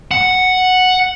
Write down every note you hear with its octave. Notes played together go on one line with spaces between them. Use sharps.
F#5